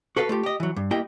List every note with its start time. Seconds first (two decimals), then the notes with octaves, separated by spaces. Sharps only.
0.17 F#4 A4 B4 F5
0.29 A3 F4 G4
0.43 G4 D#5
0.60 E3 F#3
0.76 G2
0.91 A#3 E4 G4 D#5 G5